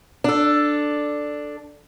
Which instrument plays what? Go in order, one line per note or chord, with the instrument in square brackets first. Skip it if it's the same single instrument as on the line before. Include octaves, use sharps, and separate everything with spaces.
[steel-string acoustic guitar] D4 A4